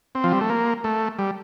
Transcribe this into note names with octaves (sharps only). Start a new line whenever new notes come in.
C4
F3
G3
A3
A#3
A3
G3